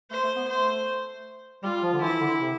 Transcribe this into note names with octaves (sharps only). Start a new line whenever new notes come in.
A3 C5
A3
B3
A3 C5
G3 F4
F3
D3
E3 E4
D3
C3